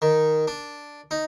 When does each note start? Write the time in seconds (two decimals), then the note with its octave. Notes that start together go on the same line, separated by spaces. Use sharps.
0.02 D#3
0.47 D4
1.11 D#4